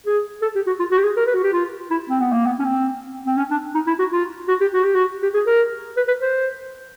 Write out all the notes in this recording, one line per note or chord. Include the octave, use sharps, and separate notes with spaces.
G#4
A4
G4
F#4
F4
F#4
G4
G#4
A#4
B4
F#4
G4
F4
E4
C4
B3
A#3
B3
C#4
C4
C4
C#4
D4
D#4
E4
F#4
F4
F#4
G4
F#4
G4
F#4
G4
G#4
A#4
B4
B4
C5